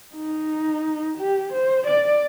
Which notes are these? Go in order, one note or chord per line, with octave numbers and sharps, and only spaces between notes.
D#4
G4
C5
D5